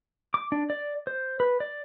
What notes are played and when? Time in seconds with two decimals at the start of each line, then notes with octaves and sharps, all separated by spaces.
0.34 D6
0.52 D4
0.70 D5
1.07 C5
1.40 B4
1.60 D5